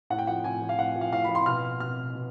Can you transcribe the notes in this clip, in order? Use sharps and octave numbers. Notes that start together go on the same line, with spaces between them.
A2 F#5
G5
F3 F#5
A2 G#5
F3
F5
A2 F#5
F3
F5
A2 F5
B5
F3
C6
B2 F6
B2 F6
B2